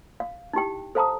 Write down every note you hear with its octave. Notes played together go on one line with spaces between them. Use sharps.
F5
D#4 E4 G4 G5
A4 C5 F5 A5 A#5 D#6